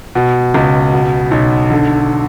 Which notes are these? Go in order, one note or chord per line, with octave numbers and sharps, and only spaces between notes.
B2
C#2
B2
B1
D3